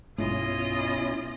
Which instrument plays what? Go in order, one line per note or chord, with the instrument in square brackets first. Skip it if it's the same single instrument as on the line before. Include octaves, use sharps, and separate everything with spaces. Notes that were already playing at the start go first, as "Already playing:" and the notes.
[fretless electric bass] B1 G2 G#3 [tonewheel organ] B2 C#4 E4 [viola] F4 D#5